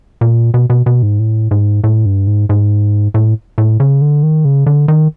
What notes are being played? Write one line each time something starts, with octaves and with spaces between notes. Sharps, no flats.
A#2
B2
B2
B2
G#2
A2
G#2
A2
G2
G#2
G#2
A2
A2
C#3
D3
D#3
C#3
D3
D#3